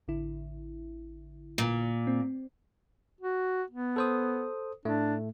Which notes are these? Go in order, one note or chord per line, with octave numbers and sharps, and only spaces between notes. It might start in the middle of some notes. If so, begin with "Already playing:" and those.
A1 D3 E4
A#2
C4
F#4
B3
A4 C5 D#6
A2 A3 D4